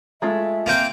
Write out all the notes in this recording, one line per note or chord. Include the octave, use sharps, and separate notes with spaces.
G#3 A3 F4 E5
A#3 C4 G5